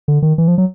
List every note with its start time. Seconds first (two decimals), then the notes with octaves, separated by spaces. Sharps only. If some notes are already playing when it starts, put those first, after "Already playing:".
0.08 D3
0.22 D#3
0.38 E3
0.48 F3
0.58 F#3